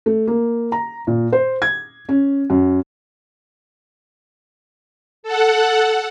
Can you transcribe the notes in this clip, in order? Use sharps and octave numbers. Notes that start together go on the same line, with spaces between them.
A3
A#3
A#5
A#2
C5
G#6
C#4
F#2
A4 F#5